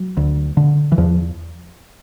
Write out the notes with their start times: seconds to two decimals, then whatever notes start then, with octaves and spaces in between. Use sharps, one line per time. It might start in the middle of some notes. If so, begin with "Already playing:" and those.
Already playing: F#3
0.17 D2
0.57 D3
0.92 E3
0.98 E2 F3